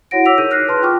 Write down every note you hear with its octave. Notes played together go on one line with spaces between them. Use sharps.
E4 F#4 C#5 F#5 A#6 D7
C#5 D6 E6 B6 F7
D#4 G#4 A#4 C#5 G6 D#7
F6 F#6 A#6 C7
B4 A5 C6
F4 G5 C#6 D6 F6